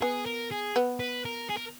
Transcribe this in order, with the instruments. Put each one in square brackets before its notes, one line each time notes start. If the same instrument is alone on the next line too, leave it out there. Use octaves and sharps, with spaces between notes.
[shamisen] B3 [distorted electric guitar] G#4
[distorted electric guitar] A#4
G#4
[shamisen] B3
[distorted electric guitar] B4
A#4
G#4
A#4